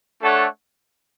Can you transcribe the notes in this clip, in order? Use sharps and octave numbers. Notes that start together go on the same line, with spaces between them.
A3 D4 A4 C#5 F#5